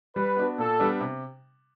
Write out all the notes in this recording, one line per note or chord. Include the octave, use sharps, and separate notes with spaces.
G3 B4
B3 D4 F#4
A#2 A4
G3 B3 D4
C3